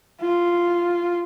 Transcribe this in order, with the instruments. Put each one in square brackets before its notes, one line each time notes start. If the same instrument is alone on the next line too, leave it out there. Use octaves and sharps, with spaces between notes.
[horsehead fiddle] F4